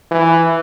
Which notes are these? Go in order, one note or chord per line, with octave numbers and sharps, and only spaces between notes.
E3